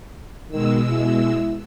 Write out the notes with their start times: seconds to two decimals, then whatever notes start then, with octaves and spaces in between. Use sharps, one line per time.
0.51 B2 D#3 G#3 E6
0.89 E4